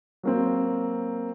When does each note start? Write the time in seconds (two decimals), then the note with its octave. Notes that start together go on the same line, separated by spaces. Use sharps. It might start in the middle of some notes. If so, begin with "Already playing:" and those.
0.23 F#3 A#3 C4